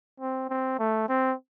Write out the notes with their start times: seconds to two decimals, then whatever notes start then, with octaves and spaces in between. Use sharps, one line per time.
0.20 C4
0.49 C4
0.79 A3
1.09 C4